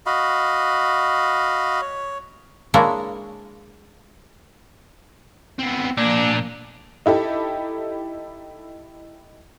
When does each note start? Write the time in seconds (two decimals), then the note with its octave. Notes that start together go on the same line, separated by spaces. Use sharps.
0.06 F#4 D#5 F5 B5
1.81 C#5
2.74 G#3 A#3 D4 E4 C#5
5.59 B3 C4
5.97 A#2 F3 A#3 D4
7.06 D#4 E4 G4 A4